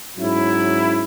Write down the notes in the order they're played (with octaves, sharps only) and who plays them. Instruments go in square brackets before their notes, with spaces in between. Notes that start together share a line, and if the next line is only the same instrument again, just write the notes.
[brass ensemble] G#2 F#3 C#4 E4